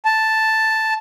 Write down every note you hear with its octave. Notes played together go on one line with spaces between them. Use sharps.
A5